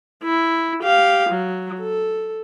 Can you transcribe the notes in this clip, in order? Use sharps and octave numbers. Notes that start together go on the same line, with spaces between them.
E4
G4 F5
F#3
A4